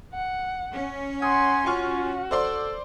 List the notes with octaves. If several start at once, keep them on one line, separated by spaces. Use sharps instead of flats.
F#5
C#4
F#5 G#5 C6 D#6
F4 F#4 G#5 C#6 F6
A4 C5 D5 C6